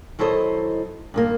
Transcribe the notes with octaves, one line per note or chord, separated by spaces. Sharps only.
D#3 F#3 E4 A4 C5 D#5
G2 D#3 A#3